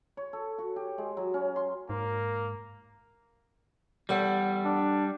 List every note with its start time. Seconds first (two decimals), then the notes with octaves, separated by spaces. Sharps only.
0.17 C#5
0.33 A4
0.58 F#4
0.76 G4
0.98 G#3
1.17 F#3
1.34 C#4
1.56 C6
1.90 G#2 A#3 A#4
4.09 E2 G3 A4 F#5
4.65 D4